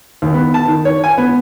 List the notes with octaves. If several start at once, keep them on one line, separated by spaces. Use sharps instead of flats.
D#2
B3
A5
D#3
C#5
G#5
B3